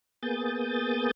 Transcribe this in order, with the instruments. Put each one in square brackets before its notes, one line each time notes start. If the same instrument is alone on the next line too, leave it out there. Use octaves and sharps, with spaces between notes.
[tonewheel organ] A#3 B3 G#4 D#6 G6 A6